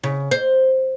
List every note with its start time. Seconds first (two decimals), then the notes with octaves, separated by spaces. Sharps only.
0.03 C#3
0.31 C5